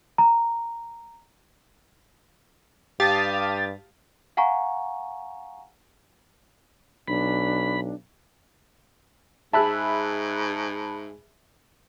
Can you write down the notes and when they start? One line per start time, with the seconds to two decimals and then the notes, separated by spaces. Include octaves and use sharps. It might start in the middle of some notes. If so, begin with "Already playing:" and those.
0.18 A#5
3.00 G2 G4 F5 A5 D#6 A6
4.37 F5 F#5 G#5 A#5 C#6
7.08 B1 D4 B5
9.53 G#2 G#4 E5 A5 B5 F#6